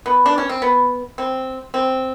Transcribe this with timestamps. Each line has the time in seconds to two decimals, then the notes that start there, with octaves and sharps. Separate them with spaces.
0.06 B3
0.26 D4
0.38 C#4
0.49 C4
0.62 B3
1.18 C4
1.74 C4